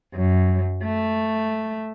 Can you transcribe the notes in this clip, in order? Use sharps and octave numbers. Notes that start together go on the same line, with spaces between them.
F#2
A3